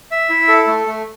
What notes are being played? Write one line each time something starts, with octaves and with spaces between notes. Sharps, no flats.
E5
E4
A4
A3
A3